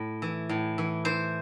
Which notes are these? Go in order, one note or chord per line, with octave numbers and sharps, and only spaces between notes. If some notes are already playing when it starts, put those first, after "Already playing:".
Already playing: A2
E3
A2
E3
E3 C5